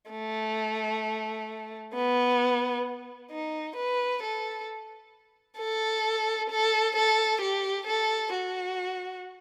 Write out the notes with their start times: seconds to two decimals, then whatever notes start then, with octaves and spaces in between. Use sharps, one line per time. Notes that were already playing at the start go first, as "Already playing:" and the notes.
0.11 A3
1.94 B3
3.31 D#4
3.76 B4
4.23 A4
5.59 A4
6.50 A4
6.96 A4
7.41 G4
7.87 A4
8.33 F#4